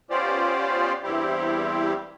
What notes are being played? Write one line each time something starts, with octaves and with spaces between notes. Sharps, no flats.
B3 C#4 F4 G4 C5 D5
E2 G2 G3 C4 E4 G4